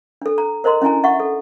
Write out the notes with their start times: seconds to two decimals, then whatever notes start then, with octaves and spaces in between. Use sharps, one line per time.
0.22 D4 A4
0.38 A#5
0.64 A#4 C5 D#5 A#5 C6
0.82 C#4 D4 E4 G#5 A#5
1.04 E5 F#5 C#6
1.20 A4